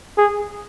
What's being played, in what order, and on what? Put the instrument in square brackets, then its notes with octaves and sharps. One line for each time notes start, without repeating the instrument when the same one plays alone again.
[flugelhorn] G#4